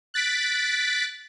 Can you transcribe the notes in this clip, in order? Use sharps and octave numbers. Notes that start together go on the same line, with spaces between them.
F#6 A6 B6 D7